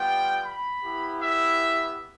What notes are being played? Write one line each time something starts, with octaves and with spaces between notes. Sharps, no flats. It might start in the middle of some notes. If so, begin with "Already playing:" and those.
Already playing: G3 B3 F4 G5
B5
B3 E4 G4
E5